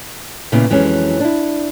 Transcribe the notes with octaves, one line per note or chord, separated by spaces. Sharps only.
A#2 C#3 A#3 B3 E4
F2 E3 F#3 G#3 C#4
D4 E4